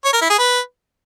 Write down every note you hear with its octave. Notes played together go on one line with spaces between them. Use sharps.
C#5
A#4
E4
G#4
B4